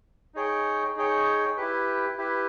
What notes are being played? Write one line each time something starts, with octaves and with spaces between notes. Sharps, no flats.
D#4 G#4 C#5 G5
D#4 G#4 C#5 G5
E4 G4 B4
E4 G4 B4